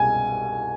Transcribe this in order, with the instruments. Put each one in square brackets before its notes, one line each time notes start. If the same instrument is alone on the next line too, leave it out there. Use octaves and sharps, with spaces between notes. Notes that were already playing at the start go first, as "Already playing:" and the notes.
Already playing: [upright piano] C2 B2 G#3 G#5